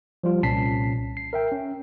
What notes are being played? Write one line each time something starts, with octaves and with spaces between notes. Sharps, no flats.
F3 G3 F4
C2 A#2 C#4 A5 B6 C7
C7
A#4 E5 G5
C#4